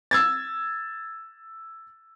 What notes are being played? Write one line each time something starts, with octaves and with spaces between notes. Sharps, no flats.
E6 G#6 A6